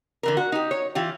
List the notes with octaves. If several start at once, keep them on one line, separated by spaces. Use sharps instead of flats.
D3 E3 A#4
F#4
D#4 G4
C#5
E3 F4 G4